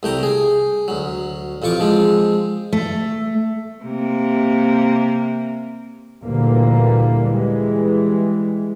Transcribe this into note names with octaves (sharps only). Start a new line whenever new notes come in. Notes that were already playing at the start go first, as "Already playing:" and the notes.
C2 A3 G5 A#5
G#4
D2 F#3
A1 F2 F4 C#6 D6
F3 G#3 C4
A3
C3 A#3
D2 A#2 D3 E3 G3 A#3
E3 G3 G#3